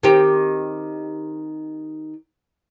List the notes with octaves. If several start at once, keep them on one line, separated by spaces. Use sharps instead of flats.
D#3 C4 G4